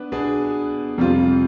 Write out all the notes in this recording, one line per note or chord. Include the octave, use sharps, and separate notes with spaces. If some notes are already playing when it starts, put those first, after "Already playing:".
Already playing: B3 D4 B4
B2 B3 D4 G#4 B4
F2 C3 G3 C4 F4